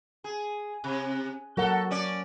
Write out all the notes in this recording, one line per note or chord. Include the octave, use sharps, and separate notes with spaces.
G#4
C3
F#3 F#4 A4 A#4 F#5
C#4 D5